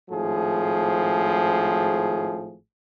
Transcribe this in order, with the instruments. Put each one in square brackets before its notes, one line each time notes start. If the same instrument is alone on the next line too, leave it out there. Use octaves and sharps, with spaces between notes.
[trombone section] G#1 A2 F3 G#4